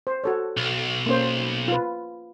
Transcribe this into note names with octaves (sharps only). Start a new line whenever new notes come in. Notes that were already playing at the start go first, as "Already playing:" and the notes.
C5
F#4 A4 C#5
B1
A#3 C#4 C5
F4 B4